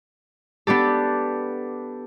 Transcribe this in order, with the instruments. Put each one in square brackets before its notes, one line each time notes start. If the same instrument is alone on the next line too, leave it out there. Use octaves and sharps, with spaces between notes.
[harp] B3 D4 G4 A4